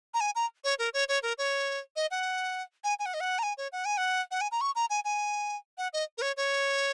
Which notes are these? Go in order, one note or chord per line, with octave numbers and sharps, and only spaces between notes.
A#5
G#5
A#5
C#5
A#4
C#5
C#5
A#4
C#5
D#5
F#5
G#5
G#5
F#5
D#5
F#5
A#5
G#5
C#5
F#5
G#5
F#5
F#5
G#5
A#5
C#6
A#5
G#5
G#5
F#5
D#5
A#4
C#5
C#5